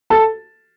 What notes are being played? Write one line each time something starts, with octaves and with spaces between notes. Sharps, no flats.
A4 A5